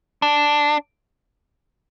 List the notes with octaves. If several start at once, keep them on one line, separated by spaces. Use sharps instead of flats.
D4